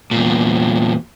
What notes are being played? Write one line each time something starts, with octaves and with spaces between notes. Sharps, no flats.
E2 A#2